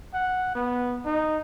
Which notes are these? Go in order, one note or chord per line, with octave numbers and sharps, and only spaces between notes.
F#5
B3
D#4